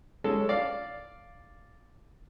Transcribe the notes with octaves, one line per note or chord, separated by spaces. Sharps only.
G#3 C#4 A4
D5 F5